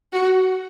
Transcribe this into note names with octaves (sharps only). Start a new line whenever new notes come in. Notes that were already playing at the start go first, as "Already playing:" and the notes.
F#4